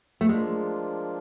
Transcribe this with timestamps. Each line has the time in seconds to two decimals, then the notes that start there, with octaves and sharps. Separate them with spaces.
0.21 A3
0.29 F3 G#3 A#3 D4 F4